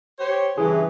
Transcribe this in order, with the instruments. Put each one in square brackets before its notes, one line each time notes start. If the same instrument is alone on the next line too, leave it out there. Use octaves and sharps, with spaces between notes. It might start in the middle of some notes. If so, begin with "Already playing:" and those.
[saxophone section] G4 C5 C#5
[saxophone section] G2 C#3 E3 [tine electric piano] G#4